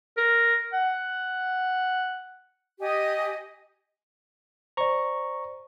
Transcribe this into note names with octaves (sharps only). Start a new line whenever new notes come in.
A#4
F#5
G4 D#5 G#5 D#6
C5 D5 A#5 C#6